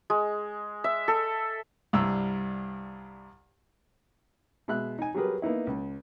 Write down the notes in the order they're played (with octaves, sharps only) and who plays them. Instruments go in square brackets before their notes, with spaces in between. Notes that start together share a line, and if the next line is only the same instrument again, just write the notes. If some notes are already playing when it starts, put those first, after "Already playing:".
[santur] G#3
E5
A4
[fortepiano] C2 G2 E6
B2 G#3 E5 F#6
D#4 G#5
F#3 G3 G4 G#4 A#4 B4
A#3 B3 D#4 E4
C#2